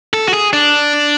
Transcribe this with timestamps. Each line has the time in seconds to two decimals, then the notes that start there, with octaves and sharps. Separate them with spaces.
0.13 A4
0.28 F#4
0.33 G#4
0.53 D4